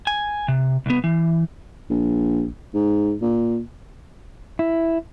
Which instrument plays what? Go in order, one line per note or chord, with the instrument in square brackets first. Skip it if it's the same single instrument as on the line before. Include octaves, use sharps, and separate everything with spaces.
[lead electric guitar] G#5
C3
C2 B3
E3
[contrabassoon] A#1
G#2
A#2
[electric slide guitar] E4